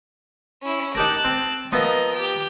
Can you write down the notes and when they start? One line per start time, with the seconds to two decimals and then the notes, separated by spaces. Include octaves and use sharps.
0.62 C#4 E4
0.95 D#4 G4 A#4 A5 F#6
1.24 C4
1.72 F3 B3 A#4 D#5 E5
2.14 G4 G5